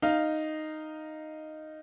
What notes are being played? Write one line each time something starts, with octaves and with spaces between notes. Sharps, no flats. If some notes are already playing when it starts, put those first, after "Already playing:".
D#4 F5